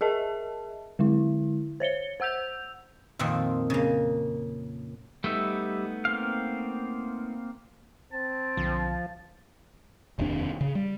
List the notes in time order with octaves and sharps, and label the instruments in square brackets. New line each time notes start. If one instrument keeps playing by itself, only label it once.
[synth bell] G#4 A#4 D#5 E5 A5
D3 G#3 E4
C5 C#5 C#7 G7
C5 F#5 E6 G6 F7
[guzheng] F2 A#2 D#3 C4
C#3 A#3
[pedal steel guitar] G3 E5 [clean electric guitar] A3 B3 D#4
[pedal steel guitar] A#3 C4 F5
[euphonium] C4 [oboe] A5
[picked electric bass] B1 D3 [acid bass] F3
[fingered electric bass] F1 D#2 C3 D4
C#3
G3